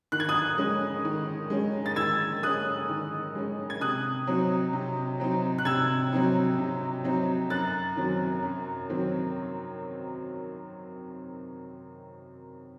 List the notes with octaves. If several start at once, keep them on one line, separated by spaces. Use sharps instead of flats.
D#3 F#6
G#6
D#6 F#6
G#3 C#4
D#3
G#3 C#4
A6
D#3 E6 G#6
G#3 C#4 D#6 F#6
D#3
G#3 C#4
G#6
C3 D#6 F#6
F#3 C4 D#4
C3
F#3 C4 D#4
F#6
C3 E6 G#6
F#3 C4 D#4
C3
F#3 C4 D#4
F#2 F#6 A6
D#3 F#3 C4
F#2
D#3 F#3 C4